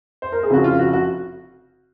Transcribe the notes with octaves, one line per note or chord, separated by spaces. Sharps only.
C5
A#4
G#4
F1 F2 C#3 F#4
F4
F#4
F#4